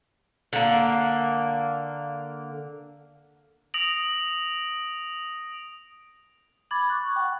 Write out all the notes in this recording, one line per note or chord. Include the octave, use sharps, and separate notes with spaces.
D3 A#3
D#6 A#6 D7 F7 F#7
B5 D6 G#6 A6 F#7
C#6 F#6
F#5 G5